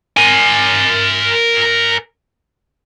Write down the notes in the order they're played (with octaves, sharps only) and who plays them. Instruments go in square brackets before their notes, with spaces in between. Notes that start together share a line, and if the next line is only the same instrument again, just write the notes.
[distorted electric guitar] A#4 G#5